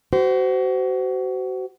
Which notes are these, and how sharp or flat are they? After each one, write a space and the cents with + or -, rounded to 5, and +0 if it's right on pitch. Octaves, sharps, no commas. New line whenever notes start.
F#4 +30 C5 -25